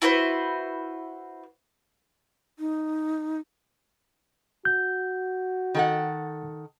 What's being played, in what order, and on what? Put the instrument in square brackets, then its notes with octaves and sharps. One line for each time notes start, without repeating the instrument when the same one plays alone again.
[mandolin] E4 F#4 B4 C5
[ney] D#4
[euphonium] F#4 [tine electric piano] G6
[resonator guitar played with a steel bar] D#3 A4 F#5